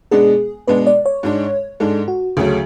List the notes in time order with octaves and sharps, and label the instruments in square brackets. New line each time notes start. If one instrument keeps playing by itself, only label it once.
[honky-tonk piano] B2 G#3 B3 D4 [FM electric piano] G#4
[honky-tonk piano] B2 G#3 B3 D4 [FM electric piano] B4
[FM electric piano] D5
C#5
[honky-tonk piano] G#2 G#3 D4
[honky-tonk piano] G#2 G#3 D4 [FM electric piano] A4
[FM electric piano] F#4
[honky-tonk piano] D2 C#3 F#3 A3 C#4 [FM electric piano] G#4